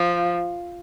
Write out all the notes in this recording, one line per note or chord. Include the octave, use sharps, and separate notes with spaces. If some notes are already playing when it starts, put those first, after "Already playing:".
Already playing: F3